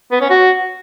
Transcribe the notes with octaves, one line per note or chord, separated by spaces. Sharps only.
B3
C#4
F#4